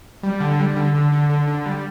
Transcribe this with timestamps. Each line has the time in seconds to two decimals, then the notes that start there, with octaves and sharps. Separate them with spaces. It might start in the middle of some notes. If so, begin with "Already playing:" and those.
0.23 G3
0.40 D3
0.59 G3
0.77 D3
0.94 D3
1.12 D3
1.29 D3
1.47 D3
1.65 G3